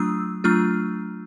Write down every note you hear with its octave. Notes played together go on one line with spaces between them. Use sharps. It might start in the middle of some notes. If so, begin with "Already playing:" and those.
Already playing: F#3 A3 D4 F4 D#6 E6
F#3 A3 D4 F4 F6